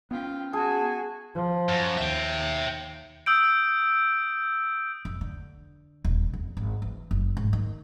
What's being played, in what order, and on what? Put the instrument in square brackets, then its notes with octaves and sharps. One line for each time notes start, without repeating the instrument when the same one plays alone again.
[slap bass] B3 C#4 [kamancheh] F4 G5
[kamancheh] F#4 G#5 [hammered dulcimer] G#4 [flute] A5
[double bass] F3
[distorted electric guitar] F#2
[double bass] D#2 [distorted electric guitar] E5 G5
[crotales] D#6 E6 G6 D7
[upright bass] F1
D3
D#1
F1
G#1
E3
F#1
G#2
D#3